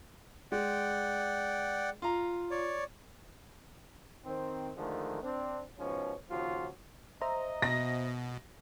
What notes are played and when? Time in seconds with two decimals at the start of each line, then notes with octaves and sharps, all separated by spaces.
0.52 G#3 D5 F#5 G5
2.02 F4 A#5
2.51 C#5 D5
4.25 D#3 C4
4.77 D3 D#3 F3 G#3 A3
5.23 C4 D4
5.79 G#2 B2 F3 C#4
6.30 D#2 C#3 F3 F4 F#4
7.21 C5 D#5 E5 A#5
7.62 B2 A#6